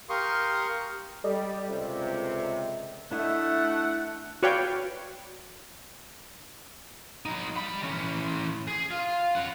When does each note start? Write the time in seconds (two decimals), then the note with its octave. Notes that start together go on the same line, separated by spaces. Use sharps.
0.09 G4 A#4 F5 C6 C#6 D#6
1.24 G3 A4 D5 D#5
1.69 C#2 C3
3.11 A3 D4 E4 D#5 F#5
4.43 F#4 B4 C#5 D5 F5 G5
7.26 F#3 D#4
7.56 G3 B5
7.83 E3 C#4
8.68 G#4
8.91 F4
9.35 C#4 F#5